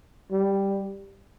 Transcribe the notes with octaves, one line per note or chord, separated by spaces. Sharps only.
G3